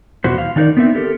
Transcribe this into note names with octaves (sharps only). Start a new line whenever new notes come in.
E2 B2 E4 F#4 C5
F5
D#3 D4 D#4 A#4 D5
B3 C4 D4 D#4 E5
G4 A4 A#4